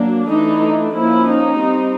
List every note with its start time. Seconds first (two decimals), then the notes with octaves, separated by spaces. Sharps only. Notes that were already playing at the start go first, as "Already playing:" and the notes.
Already playing: F#3 A#3 D4
0.31 E3 A3 D4 D#4
0.95 F3 A#3 C#4 E4
1.27 D#4
1.59 G3 C4